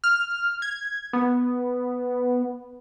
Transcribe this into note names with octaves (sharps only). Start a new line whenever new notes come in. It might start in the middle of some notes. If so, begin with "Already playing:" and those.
F6
G#6
B3